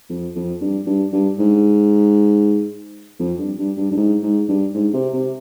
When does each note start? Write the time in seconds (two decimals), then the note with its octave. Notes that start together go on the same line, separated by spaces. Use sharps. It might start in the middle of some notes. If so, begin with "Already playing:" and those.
0.10 F2
0.35 F2
0.61 G2
0.87 G2
1.12 G2
1.39 G#2
3.20 F2
3.39 G2
3.58 G2
3.77 G2
3.91 G2
3.96 G#2
4.22 G#2
4.49 G2
4.74 G#2
4.93 C3
5.13 C3